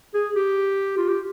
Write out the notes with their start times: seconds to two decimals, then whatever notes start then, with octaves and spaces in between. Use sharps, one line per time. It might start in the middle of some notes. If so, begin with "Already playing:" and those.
0.14 G#4
0.35 G4
0.97 F4
1.09 G4